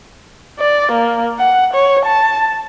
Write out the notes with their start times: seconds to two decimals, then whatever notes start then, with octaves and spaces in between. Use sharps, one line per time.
0.59 D5
0.92 A#3
1.39 F#5
1.74 C#5
2.06 A5